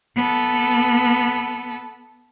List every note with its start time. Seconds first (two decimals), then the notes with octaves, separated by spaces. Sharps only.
0.17 B3 A4